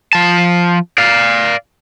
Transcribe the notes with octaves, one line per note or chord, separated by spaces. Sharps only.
F3 A5
D5 F5